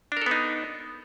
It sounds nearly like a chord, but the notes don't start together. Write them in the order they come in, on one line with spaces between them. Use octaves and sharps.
D4 A#4 A4 B3 D#4